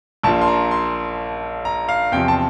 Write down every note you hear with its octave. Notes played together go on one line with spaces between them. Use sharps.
A#1 A#2 F3 A5
C6
A#5
C6
A#5
F5
E2 C3 F3 G5
A5